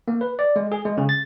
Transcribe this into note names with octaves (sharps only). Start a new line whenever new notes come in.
A#3
B4
D5
G#3
G#4
G#3
C#3
A6